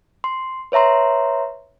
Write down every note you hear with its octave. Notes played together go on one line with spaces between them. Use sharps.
C6
B4 C#5 E5 A#5 C6